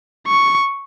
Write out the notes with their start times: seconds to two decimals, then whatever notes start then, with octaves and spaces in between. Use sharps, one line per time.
0.27 C#6